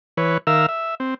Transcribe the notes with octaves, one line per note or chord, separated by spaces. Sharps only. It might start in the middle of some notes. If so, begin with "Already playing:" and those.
E3 B4 C#5
D#3 A#4 E5 F5 E6
E5
C4